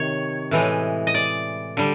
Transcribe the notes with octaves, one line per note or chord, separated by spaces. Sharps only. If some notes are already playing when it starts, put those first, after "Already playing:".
Already playing: C3 D#3 C#5
A2 E3 G#3
D#5
D5
D3 G3